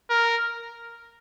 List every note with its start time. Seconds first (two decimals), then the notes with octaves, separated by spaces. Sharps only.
0.10 A#4